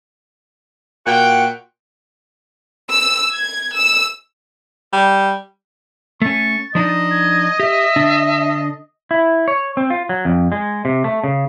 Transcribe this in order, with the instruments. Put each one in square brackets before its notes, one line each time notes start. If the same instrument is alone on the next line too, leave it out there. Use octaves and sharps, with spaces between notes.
[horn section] A#2 F#4 F#5 G5
[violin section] E6
G#6
E6
[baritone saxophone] G3
[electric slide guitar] A3 C#4 [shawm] C#6 [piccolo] A6
[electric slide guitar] F3 D4 D#4 [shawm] D#5
[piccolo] G#6
[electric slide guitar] G4 [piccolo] E5
[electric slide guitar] D3 D4
E4
C#5
C4
F4
F#3
F2
G#3
C3
A3
C#3